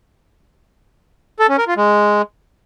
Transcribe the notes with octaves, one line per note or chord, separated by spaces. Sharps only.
A4
C#4
A#4
F4
G#3